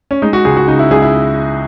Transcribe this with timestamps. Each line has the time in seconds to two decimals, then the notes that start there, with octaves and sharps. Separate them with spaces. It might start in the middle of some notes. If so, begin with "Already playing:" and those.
0.11 C#4
0.22 G#3 D#4
0.33 F#4
0.45 C#2 G#4
0.57 F#4
0.68 C#3 D#4
0.79 E4
0.91 C#2 G#4
1.02 E4